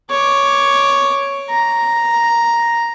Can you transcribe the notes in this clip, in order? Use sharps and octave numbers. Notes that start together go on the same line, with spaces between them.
C#5 D6
A#5